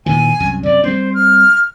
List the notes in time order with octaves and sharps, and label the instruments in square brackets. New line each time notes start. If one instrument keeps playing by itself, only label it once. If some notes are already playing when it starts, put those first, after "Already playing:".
[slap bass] A#2 D#3 E3 [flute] G#5
[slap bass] C2 F#2
[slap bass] F#2 C3 [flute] D5
[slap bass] G3 B3 C4 [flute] C5
[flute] F6